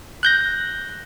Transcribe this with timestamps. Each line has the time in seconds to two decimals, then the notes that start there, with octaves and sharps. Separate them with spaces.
0.23 F#6 G6 A#6